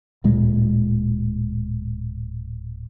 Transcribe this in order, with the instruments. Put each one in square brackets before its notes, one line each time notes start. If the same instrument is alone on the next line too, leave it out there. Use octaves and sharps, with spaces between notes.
[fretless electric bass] D1 A#2 G#3